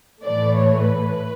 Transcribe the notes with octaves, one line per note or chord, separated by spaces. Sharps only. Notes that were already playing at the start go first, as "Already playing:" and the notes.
A2 E3 A3 D5
C#5
B4